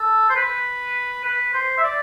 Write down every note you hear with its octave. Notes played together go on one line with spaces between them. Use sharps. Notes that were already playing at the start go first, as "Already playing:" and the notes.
Already playing: A4
C5
B4
B4
C5
E5
D5